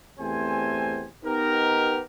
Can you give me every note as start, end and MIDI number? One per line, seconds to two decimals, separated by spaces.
0.19 1.05 40
0.19 1.05 57
0.19 1.05 60
0.19 1.05 67
0.19 1.05 72
0.19 1.05 80
1.25 2.00 59
1.25 2.00 63
1.25 2.00 67
1.25 2.00 70